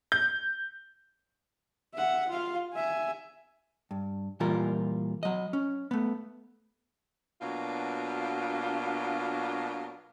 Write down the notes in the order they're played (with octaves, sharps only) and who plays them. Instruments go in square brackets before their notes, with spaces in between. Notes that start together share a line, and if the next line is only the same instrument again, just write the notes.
[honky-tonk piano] G6
[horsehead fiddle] E5 F#5
F4 F5
E5 G#5
[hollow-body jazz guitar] G2
A#2 E3 G3 F4 A#4
F#3 D#5
C#4
A3 B3
[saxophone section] B2 F#3 A#3 D4 F4